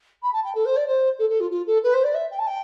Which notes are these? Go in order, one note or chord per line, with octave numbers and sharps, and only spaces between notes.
B5
A5
G5
A4
C5
D5
C5
A4
A4
F4
F4
A4
B4
C5
D5
E5
G5
A5
G5